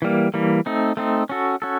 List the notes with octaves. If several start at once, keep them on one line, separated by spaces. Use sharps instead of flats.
E3 G3 A#3
E3 G3 A#3
A3 C4 D#4
A3 C4 D#4
C#4 F#4 A4
C#4 F#4 A4